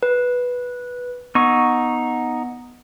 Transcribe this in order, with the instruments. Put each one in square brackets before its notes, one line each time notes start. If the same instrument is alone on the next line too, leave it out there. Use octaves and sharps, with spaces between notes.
[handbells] B4
[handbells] B3 [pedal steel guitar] D#4 C#6